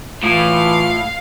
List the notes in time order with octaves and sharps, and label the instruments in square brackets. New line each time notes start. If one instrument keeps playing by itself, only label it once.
[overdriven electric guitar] A2 [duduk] E3 [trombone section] F4 [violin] F5